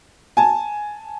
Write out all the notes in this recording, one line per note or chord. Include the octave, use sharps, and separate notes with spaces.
G#5 A5